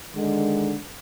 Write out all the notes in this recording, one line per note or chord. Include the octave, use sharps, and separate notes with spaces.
D3 D#3 G#3